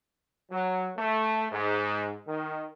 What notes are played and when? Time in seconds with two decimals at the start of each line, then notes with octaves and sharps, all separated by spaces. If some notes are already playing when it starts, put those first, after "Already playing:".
0.51 F#3
0.97 A3
1.52 G#2
2.28 D#3